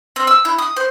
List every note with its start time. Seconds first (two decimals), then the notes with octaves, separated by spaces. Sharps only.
0.16 C4
0.27 E6
0.45 E4
0.58 D#6
0.76 C5